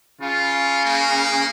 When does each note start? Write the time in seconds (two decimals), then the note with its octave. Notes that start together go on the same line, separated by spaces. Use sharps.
0.21 C#3 F4
0.85 A#3